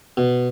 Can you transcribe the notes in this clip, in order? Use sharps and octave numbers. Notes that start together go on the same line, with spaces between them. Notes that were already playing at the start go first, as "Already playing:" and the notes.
B2